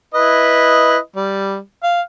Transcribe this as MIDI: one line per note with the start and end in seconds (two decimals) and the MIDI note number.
0.14 0.98 64
0.14 0.98 71
0.14 0.98 75
1.16 1.57 55
1.83 2.01 77